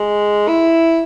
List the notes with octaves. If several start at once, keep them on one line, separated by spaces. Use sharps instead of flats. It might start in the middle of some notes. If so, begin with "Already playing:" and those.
Already playing: G#3
E4